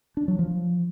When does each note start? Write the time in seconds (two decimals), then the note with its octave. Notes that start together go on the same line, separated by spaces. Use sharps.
0.17 D4
0.28 F#3
0.39 F3